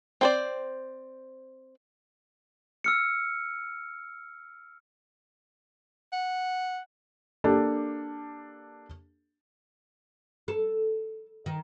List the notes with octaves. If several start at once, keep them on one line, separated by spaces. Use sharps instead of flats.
C4 C5 D5
E6 F6 C#7
F#5
A#3 D4 G4 A4
A4
D#3